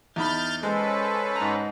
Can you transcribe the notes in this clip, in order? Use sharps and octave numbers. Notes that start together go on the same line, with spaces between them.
E2 D#4 B5 F6 G6 A6
G#3 C#4 A4 B4 C5
G#2 A#5